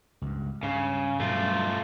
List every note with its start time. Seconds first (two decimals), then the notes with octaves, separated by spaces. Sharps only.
0.22 C#2 G2
0.63 G2 C#3
1.20 G2 B2 F#3 A3 F4